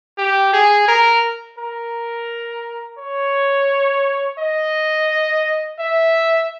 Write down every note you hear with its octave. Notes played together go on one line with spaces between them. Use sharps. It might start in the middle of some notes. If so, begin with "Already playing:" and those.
G4
G#4
A#4
A#4
C#5
D#5
E5